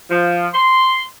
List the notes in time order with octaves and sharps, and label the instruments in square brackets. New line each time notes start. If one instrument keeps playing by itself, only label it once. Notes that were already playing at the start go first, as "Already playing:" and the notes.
[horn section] F3
C6